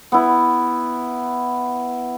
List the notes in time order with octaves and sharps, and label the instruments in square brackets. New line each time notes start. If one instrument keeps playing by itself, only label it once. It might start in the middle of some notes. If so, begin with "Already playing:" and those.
[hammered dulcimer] B3 E4